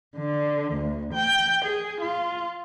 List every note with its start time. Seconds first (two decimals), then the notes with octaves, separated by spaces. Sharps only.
0.17 D3
0.74 D2
1.14 G5
1.66 G#4
2.01 F4